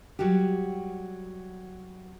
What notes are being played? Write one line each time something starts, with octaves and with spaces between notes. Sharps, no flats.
F#3 G3 F#4 G4